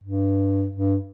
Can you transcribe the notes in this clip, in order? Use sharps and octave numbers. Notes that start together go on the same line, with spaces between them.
G2
G2